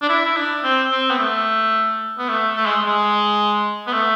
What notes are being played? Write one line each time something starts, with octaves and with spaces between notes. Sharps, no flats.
D4
E4
E4
D4
C4
C4
B3
A3
B3
A3
A3
G#3
G#3
B3
A3